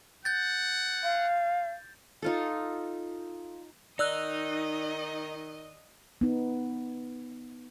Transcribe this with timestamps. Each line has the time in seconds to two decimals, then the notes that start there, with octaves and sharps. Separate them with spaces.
0.25 F#5 G6 A6
1.03 F5
2.22 D#4 F4 A4
3.99 D#3 D#4 D5 D#5 E6 F#6
6.21 B3 D#4